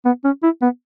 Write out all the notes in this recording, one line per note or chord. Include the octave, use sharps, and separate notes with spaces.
B3
C#4
E4
B3